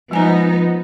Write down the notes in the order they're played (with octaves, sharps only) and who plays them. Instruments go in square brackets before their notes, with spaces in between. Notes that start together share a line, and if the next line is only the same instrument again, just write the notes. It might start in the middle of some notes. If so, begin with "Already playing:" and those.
[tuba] F3 [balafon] G#3 G#5 A#5 [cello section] B3 D#4